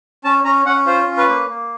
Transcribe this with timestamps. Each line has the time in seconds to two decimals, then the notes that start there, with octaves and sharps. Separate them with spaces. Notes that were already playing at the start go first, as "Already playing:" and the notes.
0.24 C#4 A5
0.44 C#4 A#5
0.66 C#4 F#5
0.86 F4 C5
1.07 C#4
1.17 B4
1.29 A#3
1.49 A#3